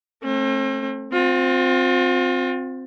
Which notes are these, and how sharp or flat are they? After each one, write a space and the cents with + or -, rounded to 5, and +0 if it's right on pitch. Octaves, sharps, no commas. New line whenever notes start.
A3 +0 C4 +40
C4 +0 F4 +35